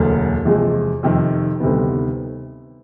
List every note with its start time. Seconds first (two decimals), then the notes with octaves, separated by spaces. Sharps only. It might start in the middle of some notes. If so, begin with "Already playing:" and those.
Already playing: E1 D2 D3 F#3 A#3
0.45 E2 C3 F3 G#3
1.03 F2 C3 D#3
1.60 D2 C3 D#3 G3 B3